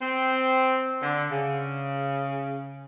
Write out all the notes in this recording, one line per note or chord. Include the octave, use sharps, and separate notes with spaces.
C4
D3
C#3